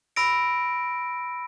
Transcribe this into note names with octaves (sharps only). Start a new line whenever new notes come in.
B5 E6 A#6 D7